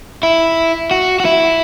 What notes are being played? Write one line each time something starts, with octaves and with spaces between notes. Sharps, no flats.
E4
F#4
F#4
E4